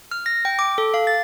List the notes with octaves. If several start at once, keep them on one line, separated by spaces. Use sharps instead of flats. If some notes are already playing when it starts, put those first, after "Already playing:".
F6
A#6
G5
D6
A4
F5
A6